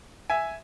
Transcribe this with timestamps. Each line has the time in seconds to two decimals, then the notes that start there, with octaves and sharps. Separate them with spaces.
0.30 E5 G#5